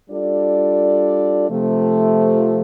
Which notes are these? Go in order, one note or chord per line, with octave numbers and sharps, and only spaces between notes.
G3 D4 F4 A4 D5
C3 F3 A3